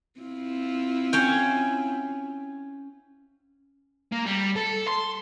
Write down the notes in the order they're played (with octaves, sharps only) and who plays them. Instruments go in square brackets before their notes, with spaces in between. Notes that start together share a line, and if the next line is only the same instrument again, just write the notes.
[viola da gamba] C4 E4 F4
[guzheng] C#4 C#5 G5
[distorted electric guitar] A#3
G3
A4
C6